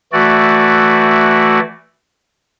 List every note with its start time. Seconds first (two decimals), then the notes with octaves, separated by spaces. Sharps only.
0.13 E3 A3 F#4 D5